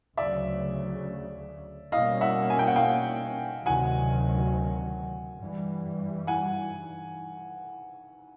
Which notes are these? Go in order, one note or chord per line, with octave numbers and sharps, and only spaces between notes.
D2 C#3 F#3 D5 E5
B2 G3 A#3 C#4 D#5 F5
E5 F#5
G#5
G5
F#5
F5 G5
D2 C3 D#3 F#3 F#5 G#5
G2 E3 G3
F#5 G#5